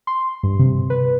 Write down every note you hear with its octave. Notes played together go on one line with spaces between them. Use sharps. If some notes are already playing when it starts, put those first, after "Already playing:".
C6
G2
C3
B4